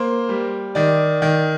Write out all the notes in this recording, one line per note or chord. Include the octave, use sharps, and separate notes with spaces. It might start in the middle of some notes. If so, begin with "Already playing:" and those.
Already playing: A#3 C5
G3
D#3 D5
D#3